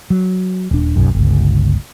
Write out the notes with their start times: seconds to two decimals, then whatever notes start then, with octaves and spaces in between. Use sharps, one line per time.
0.10 F#3
0.71 D#1 D4
0.96 D1 B1 F#2
1.15 G1 C#2